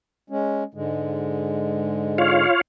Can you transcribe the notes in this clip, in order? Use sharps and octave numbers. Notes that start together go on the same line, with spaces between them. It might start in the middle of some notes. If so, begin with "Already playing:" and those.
G#3 C#4
G#2 D3 G#3
F4 C#5 F5